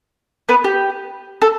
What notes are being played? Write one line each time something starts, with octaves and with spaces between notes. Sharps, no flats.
B3 B4
G4
A4